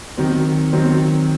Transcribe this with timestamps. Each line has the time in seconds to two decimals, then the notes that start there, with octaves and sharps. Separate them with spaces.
0.17 D#3 F#3 C4
0.73 D#3 F#3 C4